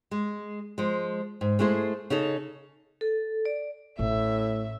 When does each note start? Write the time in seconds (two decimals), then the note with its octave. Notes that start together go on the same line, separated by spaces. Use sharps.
0.11 G#3
0.78 F3 G#3
1.41 G#2
1.59 G#3 A3 E4 G#4 C5
2.10 C#3 D#4 G#4 A4
3.01 A4
3.45 D5
3.99 A1 A2 E5